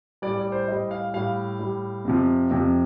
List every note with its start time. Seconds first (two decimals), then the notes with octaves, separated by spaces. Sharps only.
0.22 A2 G3 D5
0.38 D5
0.52 C5
0.68 A2 G3 D#5
0.91 F5
1.14 A2 G3 F5
1.59 A2 G3
2.05 F2 C3 F3
2.51 F2 C3 F3